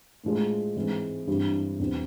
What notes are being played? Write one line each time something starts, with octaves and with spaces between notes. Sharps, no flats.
A2 F3 G#3
G#2 E3 G#3 C4 D#4
G2 E3 G3 C4 E4
E2 B2 G3 C4